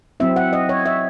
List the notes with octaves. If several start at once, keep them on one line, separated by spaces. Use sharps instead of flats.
F#3 C4 E4 E5
F#5
D#5
C#5
E5